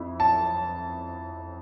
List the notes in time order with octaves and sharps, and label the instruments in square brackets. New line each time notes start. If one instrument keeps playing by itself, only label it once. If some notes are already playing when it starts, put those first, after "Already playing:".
Already playing: [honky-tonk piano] F2 E4
[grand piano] A5